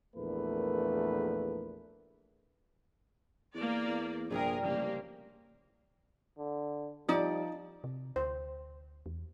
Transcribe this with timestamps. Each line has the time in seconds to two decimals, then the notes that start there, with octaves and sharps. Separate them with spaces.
0.15 A#1 E2 A3 A#4 B4
3.54 E2 A#3 D5
3.87 E2
4.30 A#1 G2 C3 G3 G#4 A#4
4.63 A1 C#3 F3 A#3 G4
6.38 D3
7.09 F3 G3 D#4 D5
7.84 C3
8.16 D2 C5
9.06 E2